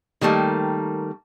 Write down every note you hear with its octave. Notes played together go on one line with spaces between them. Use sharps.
D#3 G3 A3 A#3